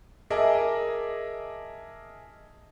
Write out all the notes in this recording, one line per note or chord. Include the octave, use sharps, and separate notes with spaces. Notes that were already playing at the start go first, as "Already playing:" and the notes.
G#4 A#4 D#5 E5 A5 D6